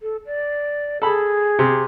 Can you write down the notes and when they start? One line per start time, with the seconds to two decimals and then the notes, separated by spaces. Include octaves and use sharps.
0.01 A4
0.26 D5
1.02 G#4 A4 B5
1.59 C3